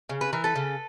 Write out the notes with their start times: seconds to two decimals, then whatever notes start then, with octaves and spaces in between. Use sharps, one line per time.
0.09 C#3
0.21 B4
0.33 E3 A#4
0.44 A4 B4
0.56 C#3